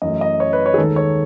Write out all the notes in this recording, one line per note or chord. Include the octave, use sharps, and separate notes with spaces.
F#2 E3 A3 D#5
D#5
C#5
B4
C#5
G#4
D#2 D#3 G#3 A4
C#5